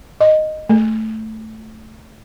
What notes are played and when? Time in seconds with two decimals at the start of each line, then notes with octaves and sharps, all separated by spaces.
0.21 D#5
0.70 A3